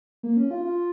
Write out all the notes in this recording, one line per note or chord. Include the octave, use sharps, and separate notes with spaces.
A#3
C#4
F4
F4